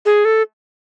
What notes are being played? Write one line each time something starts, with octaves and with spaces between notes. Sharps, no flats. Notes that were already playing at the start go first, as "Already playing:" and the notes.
G#4
A4